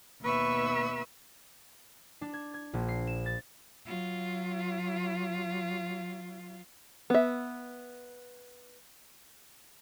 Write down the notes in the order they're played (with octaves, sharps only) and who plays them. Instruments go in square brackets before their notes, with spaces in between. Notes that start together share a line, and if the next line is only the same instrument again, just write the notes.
[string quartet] D#2 B2 B4 E5 C#6 E6
[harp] D4
G#6
G#6
A#1
C7
E7
A6
[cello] F#3 F4
[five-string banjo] B3 E5